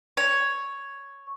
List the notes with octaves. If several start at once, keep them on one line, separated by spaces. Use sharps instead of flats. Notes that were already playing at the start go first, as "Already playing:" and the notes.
C#5